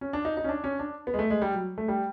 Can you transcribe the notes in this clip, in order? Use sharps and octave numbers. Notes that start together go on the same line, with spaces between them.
C#4
D4
D#4
D#4
C#4
D4
C#4
D4
B3
G#3
A3
G#3
G3
F#3
A3
G3